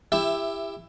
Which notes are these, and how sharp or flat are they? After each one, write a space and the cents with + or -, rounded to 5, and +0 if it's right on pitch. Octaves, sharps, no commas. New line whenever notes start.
E4 +15 G4 +25 E5 +0